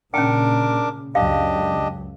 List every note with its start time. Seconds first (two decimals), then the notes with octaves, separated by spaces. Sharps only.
0.14 A#2 C#3 C#4 D4 A#4 G5 D6
1.15 C#2 F#2 F#3 D4 G4 D#5 F5